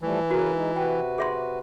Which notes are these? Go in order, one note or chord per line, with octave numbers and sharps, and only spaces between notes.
E3 F3 G3 A3
C#3 F#4 A#4 B4
G#3 D#4
C3 F#4 B4 G5
G#4 E5 C6